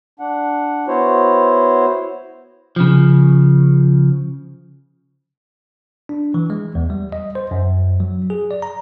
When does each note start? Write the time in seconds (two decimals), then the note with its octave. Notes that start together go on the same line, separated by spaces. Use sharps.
0.20 D4 F#5
0.88 B3 E4 F#4 C5 C#5
2.76 C#3 F3
6.09 D4
6.34 E3
6.50 G#3
6.75 E2
6.90 G3
7.12 D#5
7.35 C5
7.51 F#2
8.00 F#3
8.30 G#4
8.51 D5
8.62 A#5